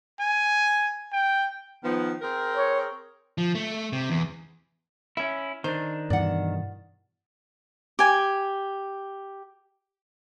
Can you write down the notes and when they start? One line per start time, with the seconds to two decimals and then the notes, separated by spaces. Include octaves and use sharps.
0.20 G#5
1.12 G5
1.83 D#3 F3 B3
2.21 C4 G#4 A#4
2.56 C#5
3.38 F3
3.55 A3
3.93 C3
4.10 E2
5.17 C#4 E4 E5
5.64 D#3 D4 C5
6.10 G2 B2 E3 D5 F#5
7.99 G4 G#5